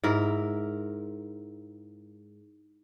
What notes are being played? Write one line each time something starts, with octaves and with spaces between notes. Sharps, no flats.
G#2 E4 A#4